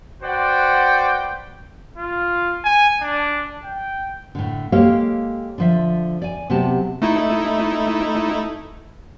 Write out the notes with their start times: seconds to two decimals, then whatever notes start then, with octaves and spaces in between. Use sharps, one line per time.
0.22 F#4 B4 C5 D5 F#5 G5
1.98 F4
2.64 G#5
3.01 D4
3.64 G5
4.35 A2 D3
4.72 G#3 A#3 G4 A4 C#5 F5
5.58 D3 F3 E5
6.22 D5 G#5
6.50 C3 F#3 B3 G4 A5
7.02 A3 D#4 E4